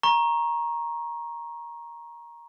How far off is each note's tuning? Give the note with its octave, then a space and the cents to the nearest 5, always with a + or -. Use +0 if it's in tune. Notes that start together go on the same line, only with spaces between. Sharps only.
A#5 +15 C#6 -20